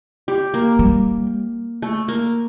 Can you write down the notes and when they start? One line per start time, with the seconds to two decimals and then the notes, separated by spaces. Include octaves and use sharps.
0.28 G4
0.54 A#3
0.79 G3
1.82 A3
2.08 A#3